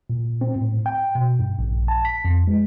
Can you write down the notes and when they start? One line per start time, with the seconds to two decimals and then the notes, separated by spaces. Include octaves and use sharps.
0.10 A#2
0.41 C4
0.56 A2
0.86 G5
1.15 B2
1.39 G2
1.59 A#1
1.88 A5
2.05 B6
2.25 F2
2.47 G#3